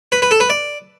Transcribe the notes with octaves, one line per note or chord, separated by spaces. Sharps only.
B4
B4
A4
B4
D5